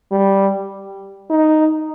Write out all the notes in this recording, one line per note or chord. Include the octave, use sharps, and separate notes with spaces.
G3
D#4